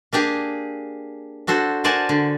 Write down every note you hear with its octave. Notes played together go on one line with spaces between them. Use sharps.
A#3 D4 G4 G#4
D4 F#4 A4 C5
A#4 C5 D5 F#5 G#5 A5
D3